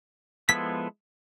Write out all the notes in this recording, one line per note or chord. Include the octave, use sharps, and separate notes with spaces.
F3 G#3 B3 E4 A4 B6